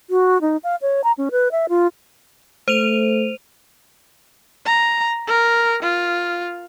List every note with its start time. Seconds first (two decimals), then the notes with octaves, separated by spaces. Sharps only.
0.10 F#4
0.41 D#4
0.64 F5
0.82 C#5
1.04 A#5
1.18 C#4
1.31 B4
1.51 E5
1.69 F4
2.68 A3 C5 D#7 F7
4.65 A#5
5.27 A#4
5.82 F4